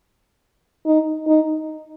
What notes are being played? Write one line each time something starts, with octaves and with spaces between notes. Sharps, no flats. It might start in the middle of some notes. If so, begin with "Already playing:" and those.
D#4
D#4